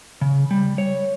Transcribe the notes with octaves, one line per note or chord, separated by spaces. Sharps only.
C#3
G3
C#5